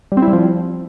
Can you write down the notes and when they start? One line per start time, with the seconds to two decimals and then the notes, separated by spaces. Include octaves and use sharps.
0.12 G3
0.17 C4
0.22 E4
0.28 G3
0.33 F3